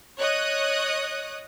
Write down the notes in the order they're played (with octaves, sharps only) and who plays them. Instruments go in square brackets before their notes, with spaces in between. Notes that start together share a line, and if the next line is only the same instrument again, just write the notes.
[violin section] C#5 D#5 D#6 F#6